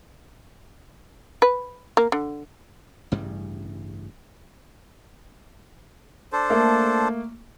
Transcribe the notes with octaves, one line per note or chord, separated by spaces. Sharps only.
B4
A#3
D3
A1 G2 C#3 G3
D4 A4 C5
A3 A#3